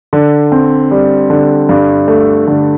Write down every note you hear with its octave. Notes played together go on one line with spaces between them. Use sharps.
D3
C4
G3
D3
G2
A3
D3